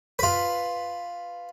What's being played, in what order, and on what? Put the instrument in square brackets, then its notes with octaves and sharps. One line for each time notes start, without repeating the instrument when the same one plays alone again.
[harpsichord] F4 B4